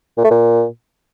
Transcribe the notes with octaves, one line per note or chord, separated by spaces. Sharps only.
A#2
A3
A#2